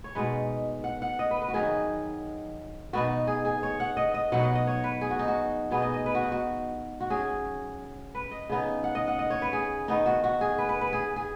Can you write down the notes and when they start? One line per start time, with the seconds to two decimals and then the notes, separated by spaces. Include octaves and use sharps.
0.04 C#5
0.15 B2 G#3 D#4 B4
0.84 F#5
1.02 F#5
1.19 D#5
1.31 B4
1.42 B4
1.48 F#4
1.54 D#3 F#3 D#4 G#4
2.93 B2 B3 D#4 F#4
3.27 G#4
3.45 G#4
3.63 C#5
3.80 F#5
3.97 D#5
4.14 D#5
4.32 B2 F#3 D#4 F#5
4.43 D#5
4.55 D#5
4.67 C#5
4.84 B4
5.01 G#4
5.10 F#4
5.19 D#4
5.28 F#4
5.71 B2 B3 D#4 G#4
5.82 D#5
5.94 D#5
6.06 B4
6.15 F#4
6.23 D#4
6.32 F#4
7.01 F#4
7.10 F#3 C#4 G#4
8.15 B4
8.31 D#5
8.50 C#3 B3 D#4
8.84 F#5
8.95 D#5
9.08 F#5
9.19 D#5
9.30 C#5
9.42 B4
9.53 G#4
9.88 D#3 B3 D#4
10.06 F#4
10.24 F#4
10.41 G#4
10.58 B4
10.69 B4
10.81 B4
10.93 G#4
11.16 G#4